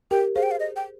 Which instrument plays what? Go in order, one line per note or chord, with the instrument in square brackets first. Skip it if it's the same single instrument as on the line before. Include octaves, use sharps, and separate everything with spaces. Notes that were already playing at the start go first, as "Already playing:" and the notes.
[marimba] G4 A#4 [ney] G5
[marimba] G#4 C5 [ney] F5
[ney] G5
F5
D#5
G5